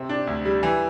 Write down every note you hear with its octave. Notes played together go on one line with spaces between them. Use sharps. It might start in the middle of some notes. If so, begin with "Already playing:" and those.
Already playing: C3 C4
D4
D2
G3
E3